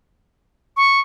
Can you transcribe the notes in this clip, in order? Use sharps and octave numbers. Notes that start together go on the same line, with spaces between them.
C#6